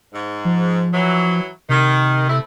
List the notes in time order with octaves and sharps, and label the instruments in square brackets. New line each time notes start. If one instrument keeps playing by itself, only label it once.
[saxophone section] G#2
[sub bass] F3
[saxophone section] E3 F#3
[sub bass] C3 [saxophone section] D#3
[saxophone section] A3 C4 E4